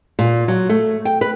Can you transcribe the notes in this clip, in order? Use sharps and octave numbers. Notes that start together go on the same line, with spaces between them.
A#2
F#3
A3
G5
B4